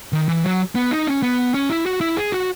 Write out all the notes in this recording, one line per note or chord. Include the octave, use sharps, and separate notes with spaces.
D#3
E3
F#3
B3
D#4
C#4
B3
C#4
E4
F#4
E4
G#4
F#4